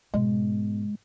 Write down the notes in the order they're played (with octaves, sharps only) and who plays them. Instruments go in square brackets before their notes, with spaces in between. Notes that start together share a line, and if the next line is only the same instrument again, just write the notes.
[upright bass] G#2 B2 [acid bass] G#3